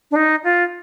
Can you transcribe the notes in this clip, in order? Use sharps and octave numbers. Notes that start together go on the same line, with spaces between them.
D4
D#4
F4